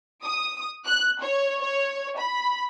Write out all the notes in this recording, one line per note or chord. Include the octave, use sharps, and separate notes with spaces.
D#6
F#6
C#5
C#5
B5